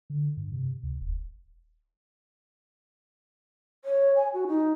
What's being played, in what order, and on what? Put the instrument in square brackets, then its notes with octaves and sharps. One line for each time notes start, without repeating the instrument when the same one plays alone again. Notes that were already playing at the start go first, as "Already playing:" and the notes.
[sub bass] D3
G2
C3
D2
D#1
[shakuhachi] C#5
G#5
F#4
D#4